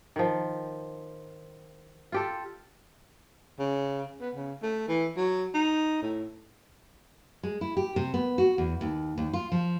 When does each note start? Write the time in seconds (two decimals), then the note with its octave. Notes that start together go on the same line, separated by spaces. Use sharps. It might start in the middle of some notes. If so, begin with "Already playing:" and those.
0.16 D#3 F3
2.12 F4 G4 A4
3.59 C#3
4.21 B3
4.35 C#3
4.63 A3
4.88 E3
5.17 F#3
5.54 D#4
6.02 A2
7.43 G#3
7.61 E4
7.77 G4
7.96 C3
8.14 B3
8.38 F#4
8.58 E2
8.81 D#2
9.18 D#2
9.33 F4
9.52 F3